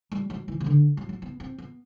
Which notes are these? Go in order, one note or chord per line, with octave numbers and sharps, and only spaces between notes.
G3
F#3
E3
C3
D3
F#3
F#3
B3
C4
B3